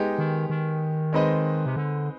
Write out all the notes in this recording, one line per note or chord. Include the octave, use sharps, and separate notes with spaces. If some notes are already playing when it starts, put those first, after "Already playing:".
Already playing: G#3 B3 D#4 G4
D#3
D#3
G#3 C4 D#4 B4 D#5
C3
D3